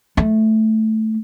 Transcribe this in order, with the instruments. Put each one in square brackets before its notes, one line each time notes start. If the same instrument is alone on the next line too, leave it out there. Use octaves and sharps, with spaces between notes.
[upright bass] A3